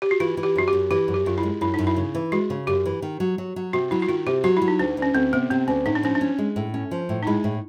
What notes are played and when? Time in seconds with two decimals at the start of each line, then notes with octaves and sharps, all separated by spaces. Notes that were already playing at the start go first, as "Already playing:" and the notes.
0.02 G4
0.11 F#4
0.20 E3 F4
0.37 E3
0.43 G4
0.56 F#2 F#4
0.68 F#2 G4
0.91 E3 G4
1.08 F#2
1.14 G4
1.26 F#2 F4
1.38 E4
1.43 G#3
1.61 F#2 E4
1.74 F#2 D#4
1.87 E4
1.96 C#3
2.15 E3
2.32 G#3 F#4
2.50 C#3
2.67 F#2 G4
2.85 E3
3.02 D#3
3.20 F#3
3.38 F#3
3.56 F#3
3.73 C3 F#4
3.91 F#3 E4
4.02 F#4
4.08 D#3 F4
4.26 C3 G4
4.44 F#3 F#4
4.57 F#3 E4
4.68 D#4
4.79 D2 D4
4.97 D2
5.02 C#4
5.14 D2 C4
5.33 C3 B3
5.50 C3 C4
5.68 D2 C#4
5.86 A2 D#4
5.95 D4
6.03 F3 C#4
6.15 D4
6.21 C#4
6.38 G#3
6.56 A2
6.74 C#4
6.91 F3
7.09 A2
7.23 D#4
7.27 G#3 E4
7.44 A2